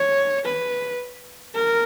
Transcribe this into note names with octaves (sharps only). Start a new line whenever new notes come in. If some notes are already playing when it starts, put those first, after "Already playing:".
Already playing: C#5
B4
A#4